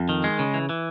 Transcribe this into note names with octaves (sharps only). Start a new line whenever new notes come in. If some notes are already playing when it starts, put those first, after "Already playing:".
Already playing: F2
D#3
G#3
C#3
E3
E3